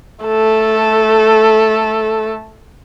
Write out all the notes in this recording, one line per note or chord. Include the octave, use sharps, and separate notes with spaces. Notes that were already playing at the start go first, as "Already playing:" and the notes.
A3 A4